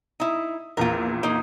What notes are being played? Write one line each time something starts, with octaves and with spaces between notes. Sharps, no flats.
D#4 E4
A#1 E2 A#2 F4 A#4
A#3 D#4